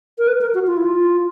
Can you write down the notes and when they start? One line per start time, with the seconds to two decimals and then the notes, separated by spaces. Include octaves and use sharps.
0.18 A#4
0.28 B4
0.41 A#4
0.54 F#4
0.67 F4
0.77 E4
0.86 F4